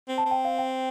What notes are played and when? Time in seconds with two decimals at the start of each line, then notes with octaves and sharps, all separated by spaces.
0.09 C4
0.18 A5
0.26 C4
0.31 G5
0.45 F5
0.58 G5